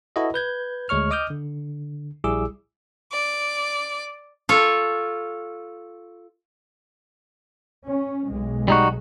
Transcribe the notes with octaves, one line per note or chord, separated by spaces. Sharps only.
E4 F#4 A4 B4 D#5
B4 G6 G#6
D2 G#3 C#5 C#6 F6
D#5 D6 D#6 F6 G6
D3
A#1 G3 E4 G#4 D6 E6
D5
F4 A4 C#5
C#4
B1 G#3
G3 D#4 F#4